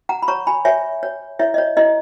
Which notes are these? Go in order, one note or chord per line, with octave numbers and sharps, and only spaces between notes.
F#5 A#5
B5
C#5 A#5 C#6
G#5 B5
C#5 E5 G#5
C#5
E4 C#5 E5
D#5
C#5
E4 D#5